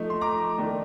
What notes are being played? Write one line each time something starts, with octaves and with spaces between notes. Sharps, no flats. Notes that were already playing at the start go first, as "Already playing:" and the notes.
Already playing: F3 A3 D#4
C6
A#5 D6
D#3 A3 D4